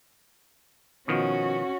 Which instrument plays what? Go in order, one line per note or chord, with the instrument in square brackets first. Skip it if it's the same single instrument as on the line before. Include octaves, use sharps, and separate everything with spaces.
[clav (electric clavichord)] B2 D#3 F3 [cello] C#4 F#4